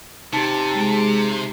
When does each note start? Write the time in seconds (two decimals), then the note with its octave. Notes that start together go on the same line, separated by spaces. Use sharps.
0.33 C3 D#4 G4 A5
0.76 G#3